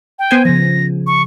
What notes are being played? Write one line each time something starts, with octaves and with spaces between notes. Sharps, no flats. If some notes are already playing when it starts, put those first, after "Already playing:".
G5
B3 C5 G#5
C#3 F3 A#6
C#6